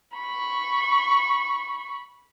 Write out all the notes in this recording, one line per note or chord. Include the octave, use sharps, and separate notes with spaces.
B5 C#6